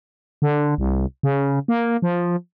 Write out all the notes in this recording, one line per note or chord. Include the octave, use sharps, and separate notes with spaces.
D3
C2
C#3
A#3
F3